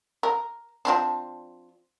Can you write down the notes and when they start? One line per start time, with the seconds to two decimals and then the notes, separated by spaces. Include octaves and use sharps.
0.23 A#4
0.85 F3 C4 D4